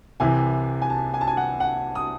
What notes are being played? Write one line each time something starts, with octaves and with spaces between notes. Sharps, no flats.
C2 C3 E3 G#5
G#5
A5
G#5
A5
G#5
F#5
F#5
D#6